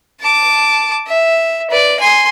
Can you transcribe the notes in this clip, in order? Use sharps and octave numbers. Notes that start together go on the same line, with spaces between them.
A5 D6
E5
B4 D5
G#5 C6